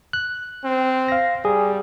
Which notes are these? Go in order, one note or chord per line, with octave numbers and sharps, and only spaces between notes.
F#6
C4
F5 A#6
G3 G#4